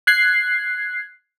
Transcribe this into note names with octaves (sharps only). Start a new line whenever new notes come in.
F#6 G#6 C7